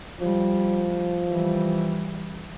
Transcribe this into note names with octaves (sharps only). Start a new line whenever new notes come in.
F3 G3
E3 G3